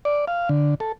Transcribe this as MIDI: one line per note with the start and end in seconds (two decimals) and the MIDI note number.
0.05 0.25 74
0.28 0.49 77
0.49 0.75 50
0.80 0.92 69